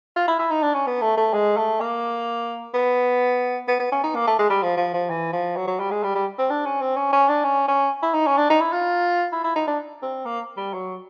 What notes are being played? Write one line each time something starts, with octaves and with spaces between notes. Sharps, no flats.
F4
E4
E4
D#4
D4
C#4
B3
A3
A3
G#3
A3
A#3
B3
B3
B3
C#4
D#4
A#3
A3
G#3
G3
F3
F3
F3
E3
F3
F#3
F#3
G3
G#3
G3
G3
C4
D4
C#4
C4
C#4
C#4
D4
C#4
C#4
E4
D#4
C#4
D4
D#4
E4
F4
E4
E4
D#4
D4
C4
A#3
G3
F#3